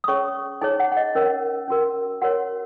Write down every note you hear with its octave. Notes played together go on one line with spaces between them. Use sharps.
D#6
C#4 G#4 C#5 C#6
D#4 G#4 C#5 G#5
F#5
F#5
D#5
C#4 A#4 C#5
C#4 F#4 A#4
F#4 A#4 C#5 F#5